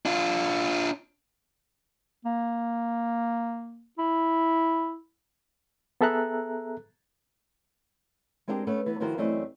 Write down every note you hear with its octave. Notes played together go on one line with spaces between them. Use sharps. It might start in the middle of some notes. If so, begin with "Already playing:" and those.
D4 F4
A#3
E4
B3 G#4 A4 E5 A#5 F#6
G#3 C4 D4 E4 G4 A#4
A3 B3 C#4 B4
E3 B3
D#3 F3 E4 F#4 A#4 C5
F#2 E3 A3 C4 D5 D#5